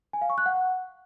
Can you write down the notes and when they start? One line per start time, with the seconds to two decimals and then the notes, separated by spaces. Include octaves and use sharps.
0.13 G#5
0.22 F5
0.30 C#6
0.38 F#6
0.46 F#5